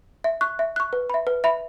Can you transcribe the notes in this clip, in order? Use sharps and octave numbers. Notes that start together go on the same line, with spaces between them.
E5
C#6 F#6
E5
C#6 F#6
B4
E5 B5
B4
E5 B5